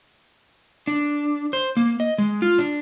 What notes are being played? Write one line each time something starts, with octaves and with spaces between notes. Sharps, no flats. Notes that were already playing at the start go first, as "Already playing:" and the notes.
D4
C5
A#3
D#5
G#3
F4
D4